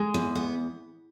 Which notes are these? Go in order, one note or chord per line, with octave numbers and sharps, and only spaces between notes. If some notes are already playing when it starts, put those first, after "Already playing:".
Already playing: G#3
E2
B3